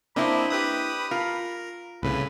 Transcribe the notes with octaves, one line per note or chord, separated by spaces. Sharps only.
A#3 C4 D4 E4 C5 D#5 B5
G4 B4 D#6
F4 A#4
C2 A2 C#3 B4